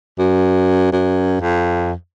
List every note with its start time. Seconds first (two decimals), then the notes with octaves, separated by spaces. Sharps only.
0.18 F#2
0.92 F#2
1.41 F2